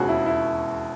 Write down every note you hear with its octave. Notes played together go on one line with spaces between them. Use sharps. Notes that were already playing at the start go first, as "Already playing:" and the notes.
Already playing: E1 D#2 C#3 F#4 G#4
E4
E4